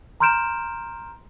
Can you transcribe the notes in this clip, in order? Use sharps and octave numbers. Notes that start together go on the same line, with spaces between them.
A#5 C6 F6 G6 D7 E7